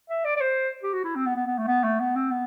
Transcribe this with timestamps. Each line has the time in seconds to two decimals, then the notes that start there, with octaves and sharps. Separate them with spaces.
0.10 E5
0.25 D5
0.36 D5
0.41 C5
0.83 G4
0.94 F#4
1.04 E4
1.16 C4
1.26 B3
1.36 B3
1.46 B3
1.58 A3
1.68 B3
1.84 A3
2.00 B3
2.16 C4
2.31 B3